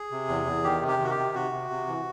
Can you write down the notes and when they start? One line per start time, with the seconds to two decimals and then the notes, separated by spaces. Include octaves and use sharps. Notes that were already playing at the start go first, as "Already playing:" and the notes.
Already playing: G#4
0.11 C3
0.28 E2
0.46 E2
0.64 D#3 G4
0.81 C3
0.88 G4
0.99 D#3
1.04 F#4
1.10 G4
1.17 C3
1.34 C3 F#4
1.52 C3
1.70 C3
1.87 E3